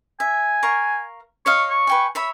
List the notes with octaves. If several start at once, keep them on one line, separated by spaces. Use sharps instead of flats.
E5 G#5
A#4 F5 C#6
C#5 D#5 F5 C#6
C#6
B4 G5 G#5
C#5 E5 B5